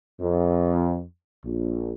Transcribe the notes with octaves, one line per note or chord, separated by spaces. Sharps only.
F2
A#1